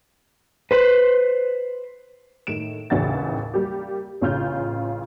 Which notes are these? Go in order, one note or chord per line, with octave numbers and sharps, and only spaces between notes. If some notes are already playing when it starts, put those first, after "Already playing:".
B4 C5
A2 D#3 D7 E7
A1 D#2 C#3 E3 F#5 A6
G3 A#3 G4
A1 C#3 C#4 F4 F6 G6